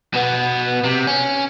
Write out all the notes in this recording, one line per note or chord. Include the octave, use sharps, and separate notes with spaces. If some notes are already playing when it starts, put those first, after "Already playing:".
B2 B3
C3
C#4